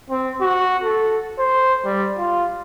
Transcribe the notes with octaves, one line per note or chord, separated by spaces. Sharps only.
C4
F#4
A4
C5
G3
F4